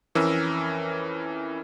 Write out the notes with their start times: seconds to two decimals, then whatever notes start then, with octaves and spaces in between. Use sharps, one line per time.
0.15 F2 E3 C#4 A#4 E6